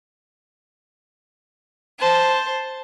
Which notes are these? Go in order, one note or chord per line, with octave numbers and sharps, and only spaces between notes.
C5 A5